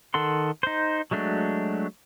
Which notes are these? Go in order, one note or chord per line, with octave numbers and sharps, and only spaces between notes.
D#3 A4 F#5 C6
D#4 C5
F#3 G#3 A3 D4 F#4